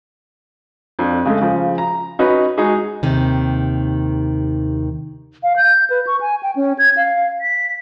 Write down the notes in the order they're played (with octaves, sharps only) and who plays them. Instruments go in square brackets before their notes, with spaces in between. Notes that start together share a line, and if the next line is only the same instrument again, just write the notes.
[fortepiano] F2 D4
C#3 G#3 A3
C#3 F3
A#5
C#4 D#4 F#4 B4
G#3 D#4 F#4 G#4
[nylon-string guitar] D#2 C3 D#3
[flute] F5
G6
B4
C#6
G#5
G5
C#4
G#6
F5
B6